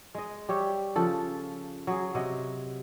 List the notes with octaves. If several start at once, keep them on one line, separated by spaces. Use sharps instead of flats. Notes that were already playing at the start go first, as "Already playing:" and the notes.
G#3 D#5
G3 G4 C#5 E5
C#3 F3 A4
F#3 G#4
C3 F#3 D#5